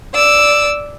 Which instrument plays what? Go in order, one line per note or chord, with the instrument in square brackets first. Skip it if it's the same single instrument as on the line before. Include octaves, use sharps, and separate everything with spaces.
[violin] D5 E6